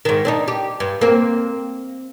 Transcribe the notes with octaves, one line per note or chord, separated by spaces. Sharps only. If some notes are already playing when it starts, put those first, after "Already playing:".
G#2 D#3
C4 D4 D#4
G4
G2
A#3 C4